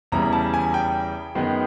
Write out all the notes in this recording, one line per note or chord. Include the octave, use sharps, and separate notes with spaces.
E2 C#3 E3 G3 A#5
A5
G#5
G5
F#2 D#3 G#3 B3